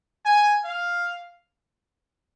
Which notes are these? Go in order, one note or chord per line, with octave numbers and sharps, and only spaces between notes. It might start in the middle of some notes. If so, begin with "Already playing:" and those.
G#5
F5